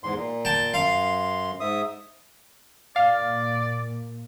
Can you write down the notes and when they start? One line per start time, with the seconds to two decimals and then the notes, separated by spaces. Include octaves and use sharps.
0.04 E2 G#2 C6
0.17 A#2
0.45 G5 A5
0.74 F#2 F5 C6
1.60 G#2 E5 D#6
2.96 A#2 D5 F5